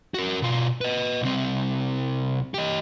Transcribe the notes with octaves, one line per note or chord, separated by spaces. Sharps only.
F#4 A#4
B2 F4
B4 D#5
C2 C4
G4 D#5